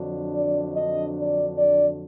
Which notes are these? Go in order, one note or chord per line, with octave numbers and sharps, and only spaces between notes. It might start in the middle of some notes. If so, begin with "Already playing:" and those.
Already playing: F2 D3 F#3 D4
D5
D#5
D5
D5